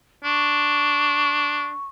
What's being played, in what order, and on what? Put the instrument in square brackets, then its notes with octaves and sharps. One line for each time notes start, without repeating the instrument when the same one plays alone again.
[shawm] D4 [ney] C#6